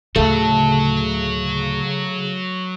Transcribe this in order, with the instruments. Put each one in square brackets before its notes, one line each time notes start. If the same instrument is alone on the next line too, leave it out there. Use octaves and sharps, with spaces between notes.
[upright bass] D2 A2 [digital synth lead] C#3 [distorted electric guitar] F#3 F#4 [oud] A3